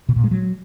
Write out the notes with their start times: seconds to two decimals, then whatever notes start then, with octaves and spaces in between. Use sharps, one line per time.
0.09 B2
0.16 A#2
0.24 G#3
0.31 F#3